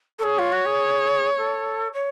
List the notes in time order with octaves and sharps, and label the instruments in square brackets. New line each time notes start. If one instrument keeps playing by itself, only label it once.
[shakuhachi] A4
[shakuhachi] G#4 [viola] C#5
[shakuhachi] F4
F#4
G#4
A4
C#5